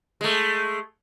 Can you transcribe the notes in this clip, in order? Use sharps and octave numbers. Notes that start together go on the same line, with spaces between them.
G#3 A3